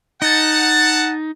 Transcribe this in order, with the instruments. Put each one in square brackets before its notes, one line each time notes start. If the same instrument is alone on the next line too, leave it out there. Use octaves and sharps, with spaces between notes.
[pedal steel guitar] D#4 [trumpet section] F#5 A5